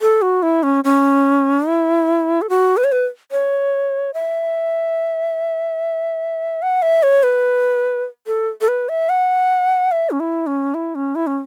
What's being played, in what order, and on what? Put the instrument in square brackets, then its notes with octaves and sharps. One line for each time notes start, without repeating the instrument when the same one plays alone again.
[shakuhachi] A4
F#4
E4
C#4
C#4
E4
A4
F#4
B4
C#5
B4
C#5
E5
F#5
E5
C#5
B4
A4
A4
B4
E5
F#5
E5
C#4
E4
C#4
E4
C#4
E4
C#4